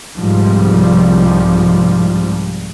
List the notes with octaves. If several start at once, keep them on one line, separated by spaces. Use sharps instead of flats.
C2 G#2 F3 G3